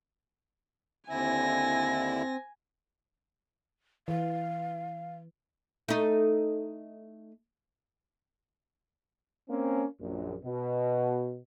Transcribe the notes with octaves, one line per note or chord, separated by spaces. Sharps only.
D#2 D3 C4 E4 G#5 A#6
E3 F5
A3 D#4
A#3 C4 C#4
A#1 F#2
B2